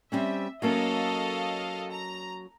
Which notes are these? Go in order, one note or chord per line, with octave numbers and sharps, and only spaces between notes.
G3 C4 C#4 E5
F#3 A#3 C#4 A4 D#5 F5
A#5